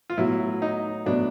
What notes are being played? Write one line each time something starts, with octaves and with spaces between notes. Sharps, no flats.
F4
A2 F#3 B3 E4
D#4
A2 F#3 B3 D4